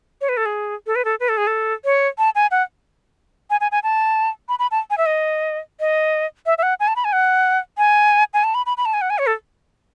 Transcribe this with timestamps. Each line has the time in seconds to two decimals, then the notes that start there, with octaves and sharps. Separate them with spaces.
0.21 C#5
0.29 B4
0.37 A4
0.46 G#4
0.87 A4
0.96 B4
1.05 A4
1.20 B4
1.29 A4
1.37 G#4
1.47 A4
1.85 C#5
2.18 A5
2.35 G#5
2.51 F#5
3.50 G#5
3.61 G#5
3.72 G#5
3.83 A5
4.49 B5
4.59 B5
4.71 A5
4.90 G#5
4.98 E5
5.06 D#5
5.80 D#5
6.46 E5
6.58 E5
6.63 F#5
6.80 G#5
6.88 A5
6.96 B5
7.05 G#5
7.13 F#5
7.78 G#5
8.34 G#5
8.44 A5
8.55 B5
8.66 B5
8.77 B5
8.86 A5
8.94 G#5
9.01 F#5
9.10 G#5
9.18 C#5
9.27 A4